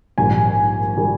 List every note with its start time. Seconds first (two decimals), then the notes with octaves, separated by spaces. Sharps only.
0.18 A#1 G#2 D#3 G3 G#5
0.97 D#3 G3